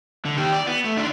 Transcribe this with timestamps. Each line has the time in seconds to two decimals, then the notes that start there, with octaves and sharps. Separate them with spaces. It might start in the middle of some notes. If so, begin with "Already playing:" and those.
0.25 D3
0.38 D#3 G4
0.52 D5
0.67 B3
0.84 A3
0.97 D#3 D4